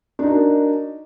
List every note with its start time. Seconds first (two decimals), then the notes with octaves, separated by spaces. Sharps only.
0.19 D4
0.23 D#4
0.26 F#4
0.30 A#4